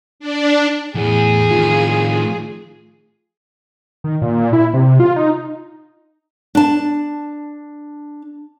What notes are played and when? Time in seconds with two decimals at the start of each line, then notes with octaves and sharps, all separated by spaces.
0.20 D4
0.95 E2 A2 G#4
1.50 A2 D#3 F4
4.04 D#3
4.22 A#2
4.53 E4
4.74 C3
5.00 F4
5.16 D#4
6.55 D4 A5